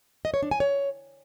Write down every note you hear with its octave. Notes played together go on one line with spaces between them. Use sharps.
D#5
C#5
D4
G#5
C#5